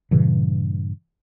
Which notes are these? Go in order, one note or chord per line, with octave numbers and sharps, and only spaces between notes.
G2 A#2 C#3 E3